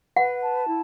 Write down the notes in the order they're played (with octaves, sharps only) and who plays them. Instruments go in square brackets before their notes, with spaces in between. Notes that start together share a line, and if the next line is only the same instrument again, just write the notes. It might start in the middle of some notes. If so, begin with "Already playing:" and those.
[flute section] B4 [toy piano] F#5
[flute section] A5
E4